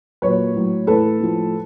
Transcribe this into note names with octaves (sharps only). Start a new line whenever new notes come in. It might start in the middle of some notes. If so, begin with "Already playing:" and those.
A#2 F#3 B4 C#5
A2 F#3
A2 E3 A4 B4
A2 F3